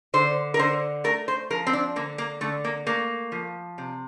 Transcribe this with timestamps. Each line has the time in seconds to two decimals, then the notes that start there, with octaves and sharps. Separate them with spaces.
0.14 D3 C5
0.54 A#4
0.59 D3 C5
1.04 A3 A#4
1.28 C5
1.50 F3 A#4
1.67 C4
1.73 D4
1.96 D3 A#3
2.18 A#3
2.41 D3 A3
2.65 A#3
2.86 A3 A#3
3.32 F3
3.78 C3